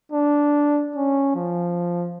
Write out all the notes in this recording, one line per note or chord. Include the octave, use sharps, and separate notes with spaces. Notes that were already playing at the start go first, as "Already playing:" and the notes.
D4
C#4
F3